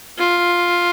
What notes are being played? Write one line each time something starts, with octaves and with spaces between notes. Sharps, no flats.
F4